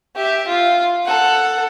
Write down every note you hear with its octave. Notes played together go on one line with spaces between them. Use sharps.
G4 E5
F4
A4 F#5